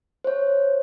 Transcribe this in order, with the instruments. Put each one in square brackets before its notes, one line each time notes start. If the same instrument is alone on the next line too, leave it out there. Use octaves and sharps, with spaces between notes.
[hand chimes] C5 C#5